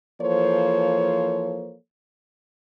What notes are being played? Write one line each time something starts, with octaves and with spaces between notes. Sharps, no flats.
E3 F3 A#3 A4 C5 C#5